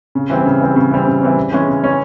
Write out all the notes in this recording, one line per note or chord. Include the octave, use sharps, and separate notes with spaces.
C#3
E3 G3 C4
C#3
E3 G3 C4
C#3
E3 G3 C4
C#3
E3 G3 C4
C#3
E3 G#3 C#4
C#3
E3 G#3 C#4